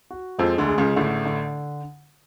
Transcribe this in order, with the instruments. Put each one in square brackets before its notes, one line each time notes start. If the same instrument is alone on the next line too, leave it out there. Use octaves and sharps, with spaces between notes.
[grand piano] F#4
[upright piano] F2 F3 [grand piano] G#3
[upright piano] D2 D3
[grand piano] G#4
[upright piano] C#2 C#3
[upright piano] A1 A2 [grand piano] D3
[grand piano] D3